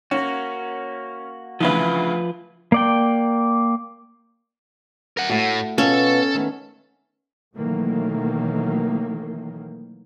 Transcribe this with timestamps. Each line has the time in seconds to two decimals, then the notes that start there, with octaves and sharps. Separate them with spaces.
0.11 A#3 C#4 F#4
1.60 D2 C#3 E3 F3 F4 B4
2.72 A#3 D5 G5
5.17 A#4 F#5
5.29 A2 A3 F#4
5.78 B2 B3 C#4 F4 A4
6.34 D#3 A3 B3
7.56 B2 D#3 E3 F#3 A3 A#3